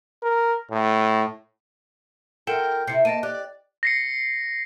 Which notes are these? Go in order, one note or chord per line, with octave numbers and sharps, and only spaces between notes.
A#4
A2
F4 A4 A#4 F#5 G5 E7
C3 E4 G6 C7 C#7
A#3 D#5 A5 D7 D#7
G4 D5 F#6
A#6 C7 C#7